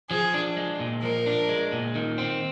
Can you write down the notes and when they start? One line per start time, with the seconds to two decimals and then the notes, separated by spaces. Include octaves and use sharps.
0.10 F3 G#4
0.34 D4
0.56 G#3
0.80 A#2
1.02 F3 A#4
1.26 D4
1.49 G#3
1.72 A#2
1.95 D#3
2.18 C4